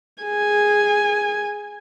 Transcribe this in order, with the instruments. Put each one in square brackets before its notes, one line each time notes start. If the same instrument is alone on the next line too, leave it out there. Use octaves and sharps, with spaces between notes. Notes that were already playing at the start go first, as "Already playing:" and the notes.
[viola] G#4 G#5